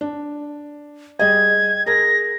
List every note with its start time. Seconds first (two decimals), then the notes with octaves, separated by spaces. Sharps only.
0.01 D4
1.19 G3 G#4 D#5 G#6
1.86 G#4 A#4 A#6